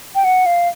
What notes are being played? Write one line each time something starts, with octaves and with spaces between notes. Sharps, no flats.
G5
F#5
F5